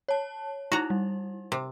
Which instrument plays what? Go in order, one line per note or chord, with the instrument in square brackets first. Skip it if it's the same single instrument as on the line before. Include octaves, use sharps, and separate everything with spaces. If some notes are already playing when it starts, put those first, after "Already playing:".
[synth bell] C#5 A5
[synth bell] D#4 E4 [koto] F#4 A#5
[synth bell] G3
[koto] C3